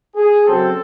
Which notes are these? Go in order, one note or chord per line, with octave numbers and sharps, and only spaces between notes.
G#4
C#3 F#3 C4 A4